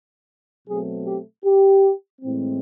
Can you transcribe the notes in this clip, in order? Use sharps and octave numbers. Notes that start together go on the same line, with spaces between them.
B2 F#3 A3 C4 G#4
G4
G4
A2 E3 G#3 C4